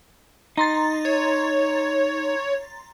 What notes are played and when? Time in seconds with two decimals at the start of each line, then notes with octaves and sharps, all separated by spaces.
0.57 D#4 A#5 C6 A6
1.05 C#5